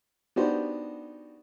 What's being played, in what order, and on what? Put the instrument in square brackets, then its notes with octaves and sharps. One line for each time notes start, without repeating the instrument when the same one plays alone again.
[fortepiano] B3 D4 D#4 F#4 G4 C5